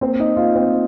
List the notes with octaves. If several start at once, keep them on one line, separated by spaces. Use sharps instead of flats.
A#3 C4 C5
D#4 D#5
A#3 F4 F5
C4 C5